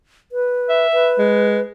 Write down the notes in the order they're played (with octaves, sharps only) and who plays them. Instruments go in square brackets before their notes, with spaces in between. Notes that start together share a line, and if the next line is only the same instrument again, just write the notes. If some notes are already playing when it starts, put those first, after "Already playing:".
[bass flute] B4
[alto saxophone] E5
[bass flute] B4
[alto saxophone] G#3